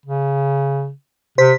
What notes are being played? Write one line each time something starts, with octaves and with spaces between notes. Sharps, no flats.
C#3
C3 C5 B6